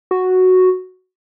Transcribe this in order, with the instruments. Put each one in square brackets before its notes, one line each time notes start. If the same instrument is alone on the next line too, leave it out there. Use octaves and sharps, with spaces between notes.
[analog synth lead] F#4